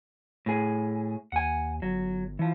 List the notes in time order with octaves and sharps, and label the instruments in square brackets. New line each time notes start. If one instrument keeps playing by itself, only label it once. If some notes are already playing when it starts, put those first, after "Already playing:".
[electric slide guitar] A2 G#4
[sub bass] D#2 [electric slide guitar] F#5 G#5
[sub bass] G1 [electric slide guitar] F#3
[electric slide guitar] E3 F3